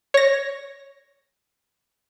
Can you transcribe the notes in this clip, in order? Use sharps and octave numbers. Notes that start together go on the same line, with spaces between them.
C#5 A#6